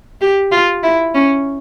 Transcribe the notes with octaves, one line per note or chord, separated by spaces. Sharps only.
G4
F4
E4
C#4